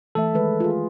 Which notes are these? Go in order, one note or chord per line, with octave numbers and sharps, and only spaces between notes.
E3 A3 A4 E5
D#3 G#3 B4
F4 G#4